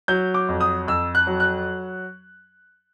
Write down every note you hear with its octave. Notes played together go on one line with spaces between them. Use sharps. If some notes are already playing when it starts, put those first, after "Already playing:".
F#3 G6
D6
F2
D#6
F2 E6
F#6
F#3
F#6